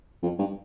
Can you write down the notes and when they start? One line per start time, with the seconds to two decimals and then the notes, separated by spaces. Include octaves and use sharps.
0.23 F2
0.39 G2